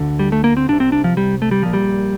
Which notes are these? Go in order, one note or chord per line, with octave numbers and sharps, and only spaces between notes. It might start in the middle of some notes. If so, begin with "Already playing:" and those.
Already playing: D2 D3
G3
A3
A#3
C4
C2 C3 D4
C4
D4
F3
G3
A3
G3
A#1 A#2 F3
G3